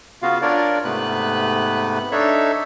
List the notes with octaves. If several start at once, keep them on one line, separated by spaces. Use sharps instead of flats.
C#3 B3 F4 F#4 F5
D4 F4 A#4 C#5 D5
G#2 C3 A3 B3 B4 F#6
D4 D#4 A4 C#5 E5